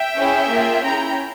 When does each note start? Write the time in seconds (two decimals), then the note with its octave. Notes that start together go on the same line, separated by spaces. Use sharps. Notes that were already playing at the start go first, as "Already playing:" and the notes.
Already playing: E5 G5
0.18 C#4 E4 G#4
0.51 A#3 F4 G#4
0.83 C#4 E4 G#4 G5 A#5